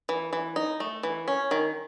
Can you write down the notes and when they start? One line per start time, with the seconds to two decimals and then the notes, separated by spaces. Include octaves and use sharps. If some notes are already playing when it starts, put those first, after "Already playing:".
0.09 E3
0.33 E3
0.56 D#4
0.80 A3
1.03 E3
1.28 C#4
1.51 D#3